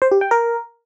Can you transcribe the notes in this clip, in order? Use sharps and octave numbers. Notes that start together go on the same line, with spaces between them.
C5
G4
G5
A#4